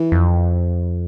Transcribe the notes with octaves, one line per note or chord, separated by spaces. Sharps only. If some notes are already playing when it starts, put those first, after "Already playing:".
Already playing: E3
F2